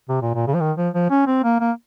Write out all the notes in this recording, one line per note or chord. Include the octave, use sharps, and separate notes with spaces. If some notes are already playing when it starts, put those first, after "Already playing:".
C3
A#2
A#2
C#3
F3
D#3
F3
F3
C#4
C4
A#3
A#3